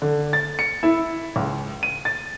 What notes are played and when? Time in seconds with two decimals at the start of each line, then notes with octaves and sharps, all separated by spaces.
0.02 D3
0.33 A6
0.59 C#7
0.83 E4
1.36 C#2
1.83 D#7
2.05 A6